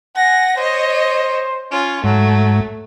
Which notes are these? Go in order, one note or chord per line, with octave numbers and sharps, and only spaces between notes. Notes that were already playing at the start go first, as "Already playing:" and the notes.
F#5 G#5 A#6
C5 C#5 D#5
C#4 F4
G#2 F#3 A3